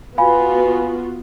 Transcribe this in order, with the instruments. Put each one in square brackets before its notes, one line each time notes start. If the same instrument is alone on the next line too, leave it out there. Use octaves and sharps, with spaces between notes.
[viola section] B3 F4 F#4 [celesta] F5 G#5 B5